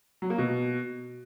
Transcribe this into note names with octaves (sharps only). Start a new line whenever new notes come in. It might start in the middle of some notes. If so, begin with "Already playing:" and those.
F#3
A#3
B2